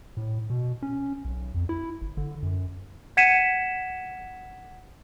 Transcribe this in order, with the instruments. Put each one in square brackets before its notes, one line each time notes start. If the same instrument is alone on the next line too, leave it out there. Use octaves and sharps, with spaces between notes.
[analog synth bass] A2
B2
C#4
B1
F2
E4
G1
D3
F#2
[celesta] F#5 G#6 B6 C#7 D#7 E7